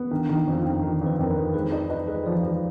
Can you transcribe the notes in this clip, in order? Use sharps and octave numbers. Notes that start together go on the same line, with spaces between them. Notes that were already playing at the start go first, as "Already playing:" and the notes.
Already playing: B3
D#3 D4
D#3
D#4
F2
F4
F2
D#3 D#4
F2
B4
F2 A#4
B4
F2
G#3 B4
D#4 D5
D#4 B4
G#3 B4
F3 D5
F3